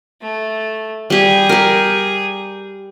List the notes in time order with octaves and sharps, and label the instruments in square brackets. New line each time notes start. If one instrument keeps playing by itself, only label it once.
[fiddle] A3
[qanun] G3 G4 [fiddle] G#4
[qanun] G4 A#4